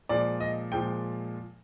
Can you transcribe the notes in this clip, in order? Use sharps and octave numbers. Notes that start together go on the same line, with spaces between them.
A#2 F3 G#3 D5
D#5
A#2 F3 G#3 G5